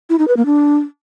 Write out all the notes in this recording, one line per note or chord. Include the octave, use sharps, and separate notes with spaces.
E4
D#4
B4
A#3
D4